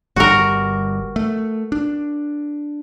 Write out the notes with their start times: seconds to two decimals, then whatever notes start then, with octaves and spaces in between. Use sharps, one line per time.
0.16 G1 G3 F#4 A#4
1.16 A3
1.72 D4